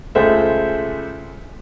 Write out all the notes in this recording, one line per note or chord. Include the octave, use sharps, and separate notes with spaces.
C#2 G#3 A3 C5 E5